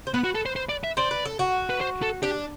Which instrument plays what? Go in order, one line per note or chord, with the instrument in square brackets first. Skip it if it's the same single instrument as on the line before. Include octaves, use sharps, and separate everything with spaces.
[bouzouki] C5
[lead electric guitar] B3 [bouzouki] B4
[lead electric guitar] F#4
A4
C5
C5
D5
E5
[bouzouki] C5 [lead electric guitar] D5
[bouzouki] B4
A4
F#4
[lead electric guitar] B4
C5
A4
[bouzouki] D4 [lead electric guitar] G4